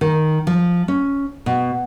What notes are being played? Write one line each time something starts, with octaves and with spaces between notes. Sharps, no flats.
D#3
F3
C#4
B2